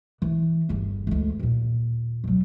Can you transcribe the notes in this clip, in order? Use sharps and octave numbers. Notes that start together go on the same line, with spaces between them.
E3
G1 E2
D2 G#3
D#2 A#2
B2 F#3